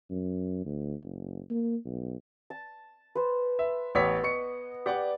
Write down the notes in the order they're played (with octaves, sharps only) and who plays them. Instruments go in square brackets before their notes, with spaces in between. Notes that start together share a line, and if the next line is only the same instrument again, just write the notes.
[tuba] F#2
D2
F#1
A#3
B1
[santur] A5
B4 C5
[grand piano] E5
[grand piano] A1 C#5 B6 [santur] B3
[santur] D#5 [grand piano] C#6 C#7
[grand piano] G4 F#5 [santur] D5 D6